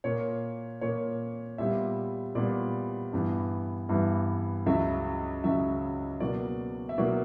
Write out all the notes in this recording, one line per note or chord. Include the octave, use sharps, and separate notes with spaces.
A#2 A#3 C#5
A#2 A#3 C#5
A#2 G3 B3 E5
A#2 G3 B3 D5
G2 E3 B3
G2 E3 B3 E5
C#2 C#3 F#3 E5
C#2 C#3 F#3 E5
B2 F#3 A#3 D5
E5
B2 F#3 A#3 D5